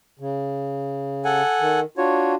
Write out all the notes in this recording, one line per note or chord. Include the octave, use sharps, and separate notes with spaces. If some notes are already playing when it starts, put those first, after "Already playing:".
C#3
A4 F#5 G#5
D#3
D4 F4 F#4 C#5